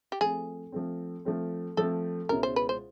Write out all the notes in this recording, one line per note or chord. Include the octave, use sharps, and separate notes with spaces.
G4
F3 A3 C4 G#4
F3 A3 C4
F3 A3 C4
F3 A3 C4 A4
C#2 B2 G#3 C#4 E4 A#4
C5
B4
C5